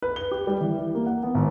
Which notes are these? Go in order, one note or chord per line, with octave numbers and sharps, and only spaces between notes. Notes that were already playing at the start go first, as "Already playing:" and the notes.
B4
G7
G4
G3
E3
E4
A#3
F#5
B3
G#1